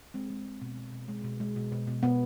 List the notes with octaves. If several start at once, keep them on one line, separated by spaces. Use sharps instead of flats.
G#3 C4
G#3
G#3
B2
B2
B2
G#3
B2
G#3
B2
B2
B2
B2 B3